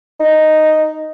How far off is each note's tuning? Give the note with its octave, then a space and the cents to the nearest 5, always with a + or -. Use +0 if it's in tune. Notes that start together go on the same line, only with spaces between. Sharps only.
D#4 +0